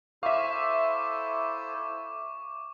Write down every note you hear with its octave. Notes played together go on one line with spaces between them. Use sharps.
E4 A4 C5 E5 F5 C#6 D6